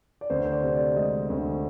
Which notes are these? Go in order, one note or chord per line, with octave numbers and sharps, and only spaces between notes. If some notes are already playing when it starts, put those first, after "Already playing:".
D5
D2 C5
C5
D5
C3
D5
G#3 D#5
D2